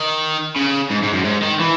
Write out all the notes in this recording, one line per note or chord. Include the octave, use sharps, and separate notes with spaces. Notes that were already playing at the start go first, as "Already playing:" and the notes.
Already playing: D#3
C#3
G#2
G#2
F#2
G#2
D#3
E3